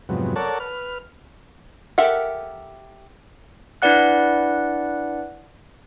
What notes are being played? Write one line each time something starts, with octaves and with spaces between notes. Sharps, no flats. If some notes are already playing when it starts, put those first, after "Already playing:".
F2 G#2 C3 F#3 B3
A4 A#4 C#5 D5 F#5 A5
B4 F6
G4 A4 A#4 E5 F#5
D4 E4 B4 D5 F#5 F#6